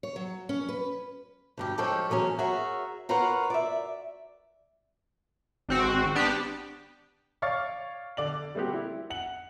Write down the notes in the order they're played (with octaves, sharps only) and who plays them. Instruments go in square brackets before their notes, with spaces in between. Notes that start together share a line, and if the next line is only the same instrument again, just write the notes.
[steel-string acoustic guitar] C#5
F#3
C#4
B4
D2 G2 G4
F3 G#3 G4 A4 C#5
E3 F#3 G#3 C#4
F#4 G#4 A#4 C#5 E5
F4 A#4 B4 C#5 F5 F#5
D5 E5
[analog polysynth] G#1 C4 F#4
B3 D4 G4
[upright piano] C#5 D5 F5 C#6 F6 A6
D3 D5 F#7
G3 A3 A#3 C4 F#4 G4
E4
F#5 F#7